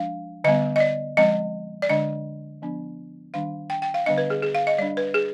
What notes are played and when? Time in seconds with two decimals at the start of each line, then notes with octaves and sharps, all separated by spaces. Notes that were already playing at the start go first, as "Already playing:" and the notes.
Already playing: F3 G#3 D4 F5
0.44 D3 G3 B3 D#5
0.76 D#5
0.80 D5
1.17 F3 G#3 C4 D#5
1.82 D5
1.89 D3 G#3 D4 D#5
2.62 F3 B3 D4
3.34 D#3 G3 D4 F5
3.70 G5
3.82 G5
3.94 F5
4.06 D3 G3 B3 D4 D#5
4.18 B4
4.30 G#4
4.43 G#4
4.55 F5
4.67 D#5
4.78 G3 D4 D5
4.97 B4
5.14 G#4